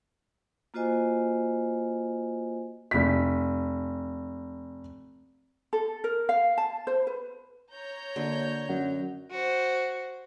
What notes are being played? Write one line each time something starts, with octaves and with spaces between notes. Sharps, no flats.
A#3 F4 F#4 C5 D#5 G#5
F1 B6
A4
A#4
F5
A5
C5
B4
C#5 A#5 G6
D3 A#3 F#4
F#2 F#5
F#4 C5